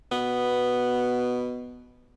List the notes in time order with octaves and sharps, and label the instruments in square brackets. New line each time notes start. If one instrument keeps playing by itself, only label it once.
[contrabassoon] B2 [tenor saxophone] B3